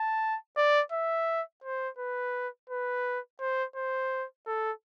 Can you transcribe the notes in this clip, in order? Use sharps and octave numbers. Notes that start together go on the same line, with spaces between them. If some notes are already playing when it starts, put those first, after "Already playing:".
Already playing: A5
D5
E5
C5
B4
B4
C5
C5
A4